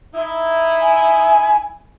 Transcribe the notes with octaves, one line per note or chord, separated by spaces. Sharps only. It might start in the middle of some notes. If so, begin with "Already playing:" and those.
D#4 E4
G#5